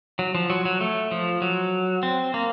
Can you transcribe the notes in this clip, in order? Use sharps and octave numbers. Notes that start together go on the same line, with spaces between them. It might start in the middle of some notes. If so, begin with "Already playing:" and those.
F#3
F3
F#3
F#3
A3
F3
F#3
C4
A#3